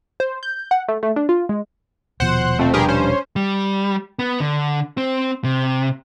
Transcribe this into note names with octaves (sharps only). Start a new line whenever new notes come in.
C5
G6
F#5
A3
A3
D4
F4
G#3
D#1 B2 F3 C5 F#5
F2 A3 C4
G2 G4 G#4 A#4
C#4 C5
G3
B3
D3
C4
C3